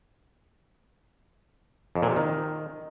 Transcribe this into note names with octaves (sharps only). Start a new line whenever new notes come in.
F2
A#2
C3
D#3